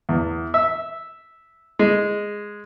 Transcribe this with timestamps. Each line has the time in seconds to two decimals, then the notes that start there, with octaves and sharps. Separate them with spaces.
0.09 E2
0.54 E5
1.79 G#3